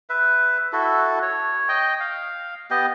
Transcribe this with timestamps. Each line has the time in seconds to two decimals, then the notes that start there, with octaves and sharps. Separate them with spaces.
0.10 B4 E5
0.73 E4 F#4 A4
1.22 C#5
1.69 D#5 G5
2.00 F5
2.70 B3 G4 D#5